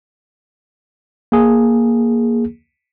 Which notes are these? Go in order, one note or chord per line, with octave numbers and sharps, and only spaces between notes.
A#3 G#4